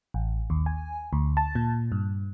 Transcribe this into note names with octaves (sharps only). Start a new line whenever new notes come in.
A1
D#2
G#5
D2
A5
A#2
G2